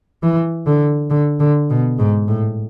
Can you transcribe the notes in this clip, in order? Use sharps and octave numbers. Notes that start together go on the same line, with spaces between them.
E3
D3
D3
D3
B2
G#2
A2